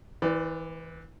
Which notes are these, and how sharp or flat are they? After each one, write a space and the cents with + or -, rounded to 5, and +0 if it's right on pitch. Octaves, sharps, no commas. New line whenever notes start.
E3 -25 B4 +45 D5 +0